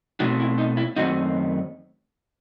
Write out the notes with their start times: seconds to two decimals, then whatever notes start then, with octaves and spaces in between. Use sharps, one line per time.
0.20 B2 A3 C4 D#4 F#4
0.40 E4
0.58 D#4
0.77 E4
0.96 F#2 D#3 A3 C4 D#4 F#4